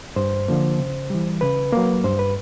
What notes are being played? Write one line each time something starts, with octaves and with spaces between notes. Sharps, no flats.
G2 C5
D3 F3 A#3
C#3
E3 G3
C#3 B4
F#3 A#3
G2 C5
B4